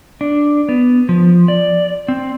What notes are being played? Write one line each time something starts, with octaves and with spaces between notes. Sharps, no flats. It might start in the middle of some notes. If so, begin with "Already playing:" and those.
D4
B3
F3
D5
C4